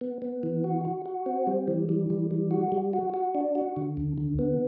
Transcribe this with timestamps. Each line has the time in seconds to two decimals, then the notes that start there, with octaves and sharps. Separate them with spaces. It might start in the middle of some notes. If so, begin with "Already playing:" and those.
0.01 B3
0.22 B3
0.43 E3
0.64 F#4
0.85 F#4
1.06 F#4
1.26 C4
1.47 G3
1.68 E3
1.89 G3
2.10 E3
2.31 G3
2.51 F#4
2.72 G3
2.93 F#4
3.14 F#4
3.35 D4
3.55 F#4
3.76 D3
3.97 D2
4.18 D3
4.39 B3